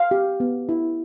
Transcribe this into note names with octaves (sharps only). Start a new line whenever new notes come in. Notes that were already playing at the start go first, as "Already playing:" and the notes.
Already playing: F5
G4
B3
E4